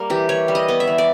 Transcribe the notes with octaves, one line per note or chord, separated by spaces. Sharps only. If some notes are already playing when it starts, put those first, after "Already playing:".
Already playing: G3 A#3
E3 G4
E3 C#5
G3
D#5
B3
E5
E3
D5